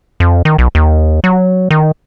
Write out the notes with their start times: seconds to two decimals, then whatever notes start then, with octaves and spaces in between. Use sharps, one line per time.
0.20 F2
0.45 D#3
0.58 B1
0.75 D#2
1.24 F#3
1.71 D#3